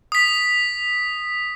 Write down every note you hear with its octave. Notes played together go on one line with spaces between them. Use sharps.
D#6 B6